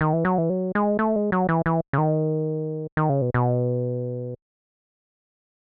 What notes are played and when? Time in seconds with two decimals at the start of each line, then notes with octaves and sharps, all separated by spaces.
0.01 D#3
0.13 E3
0.25 F#3
0.38 E3
0.50 F#3
0.75 G#3
0.99 A3
1.16 G#3
1.32 F#3
1.49 E3
1.66 E3
1.93 C#3
1.98 D#3
2.97 D#3
3.09 C#3
3.22 B2
3.34 B2